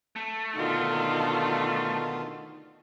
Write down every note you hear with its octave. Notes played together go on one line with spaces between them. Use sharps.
A3
B2 D3 D#3 D#4 F4